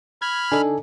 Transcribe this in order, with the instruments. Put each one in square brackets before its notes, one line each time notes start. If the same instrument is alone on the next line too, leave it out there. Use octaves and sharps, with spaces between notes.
[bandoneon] B5 F6 [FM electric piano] G#6
[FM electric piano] D3 D4 D#4 [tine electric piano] A4 G#5